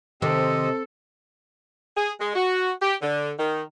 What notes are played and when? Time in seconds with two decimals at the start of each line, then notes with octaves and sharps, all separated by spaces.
0.22 C3 D#3 C4 G4 A4 D#5
1.96 G#4
2.20 G#3
2.36 F#4
2.81 G4
3.02 D3
3.38 D#3